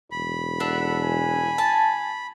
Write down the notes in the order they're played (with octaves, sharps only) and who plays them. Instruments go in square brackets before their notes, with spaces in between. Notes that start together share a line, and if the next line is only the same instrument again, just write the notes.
[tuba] E1 [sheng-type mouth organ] B5
[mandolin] D4 E5 [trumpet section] A4 B4 F#5
[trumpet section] G#5
[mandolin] A5